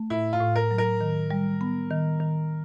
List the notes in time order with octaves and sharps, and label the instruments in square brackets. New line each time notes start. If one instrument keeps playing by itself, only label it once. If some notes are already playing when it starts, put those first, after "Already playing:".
Already playing: [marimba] A3
[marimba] A2 [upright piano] E4
[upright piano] F4
[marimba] A2
[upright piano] A#4
[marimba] F#3
[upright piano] A#4
[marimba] D#3
G3
B3
D#3
D#3